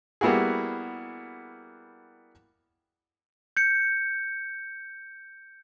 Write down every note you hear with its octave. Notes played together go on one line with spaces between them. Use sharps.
G3 A#3 B3 E4 F#4 G#4
G6 C#7